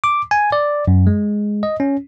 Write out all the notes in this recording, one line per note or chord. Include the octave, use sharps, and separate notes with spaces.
D6
G#5
D5
F#2
G#3
D#5
C#4